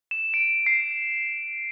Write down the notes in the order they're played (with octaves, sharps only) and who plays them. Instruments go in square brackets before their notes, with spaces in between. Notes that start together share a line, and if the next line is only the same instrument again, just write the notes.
[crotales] E7
D7
C7